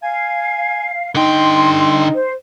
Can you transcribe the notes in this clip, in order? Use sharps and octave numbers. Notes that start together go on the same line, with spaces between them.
F5 G#5
D3 D#4 G5 C6
C5